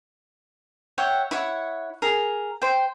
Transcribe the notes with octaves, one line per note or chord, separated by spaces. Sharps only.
C#5 E5 F#5 G5
E4 C#5 F#5
G#4 A#4
C5 G5